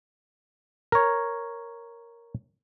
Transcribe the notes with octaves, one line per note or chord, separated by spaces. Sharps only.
A#4 C#5